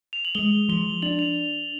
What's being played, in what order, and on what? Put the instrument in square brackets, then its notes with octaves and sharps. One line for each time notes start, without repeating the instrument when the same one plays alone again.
[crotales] F7
F#7
[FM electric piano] G#3 [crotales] G7
[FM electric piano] F3 [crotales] G7
[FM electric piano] D4 [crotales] F#7
[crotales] F7